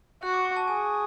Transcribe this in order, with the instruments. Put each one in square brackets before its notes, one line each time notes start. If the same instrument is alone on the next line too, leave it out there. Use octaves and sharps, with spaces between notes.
[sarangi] F#4 [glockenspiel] F#6
[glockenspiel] D6
C#6
A5
[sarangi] G#4 [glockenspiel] G#5